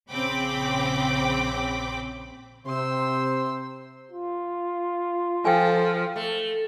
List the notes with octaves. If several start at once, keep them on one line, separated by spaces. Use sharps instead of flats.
A#1 C#3 C4 G5 B5 D6
C3 C5 C6 E6
F4
F3 A4 G5 G#5
A3